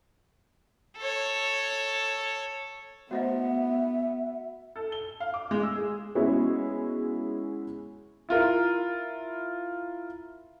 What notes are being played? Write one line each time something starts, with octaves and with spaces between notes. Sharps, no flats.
A4 C#5
A3 B3 F#4 C5 D#5 E5 F#5
A4
G7
F5
D6
G#3
E6
G#4
G#3 B3 C#4 E4 F#4 G#4
E4 F4 A#4